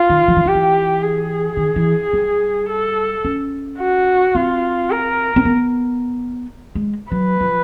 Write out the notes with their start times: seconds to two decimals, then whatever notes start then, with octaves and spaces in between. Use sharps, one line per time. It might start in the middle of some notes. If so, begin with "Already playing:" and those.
Already playing: F4
0.10 D#3
0.28 F3
0.37 E3
0.46 D#3 G4
0.55 E3
1.03 G#4
1.57 D#3
1.76 E3
2.13 G3
2.69 A4
3.25 C#4
3.79 F#4
4.35 C4 F4
4.91 A#4
5.36 C4
5.45 B3
6.75 G#3
7.12 F#3 B4
7.41 F3